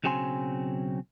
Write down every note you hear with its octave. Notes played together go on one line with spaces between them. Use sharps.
B1 C#3 F#3 C4 G#5 C6